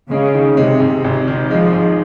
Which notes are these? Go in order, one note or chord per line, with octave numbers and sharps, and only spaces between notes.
C#3 G#3
D#3
C3 G#3
G#2
G#1 C3
D#3
F3 G#3
G#2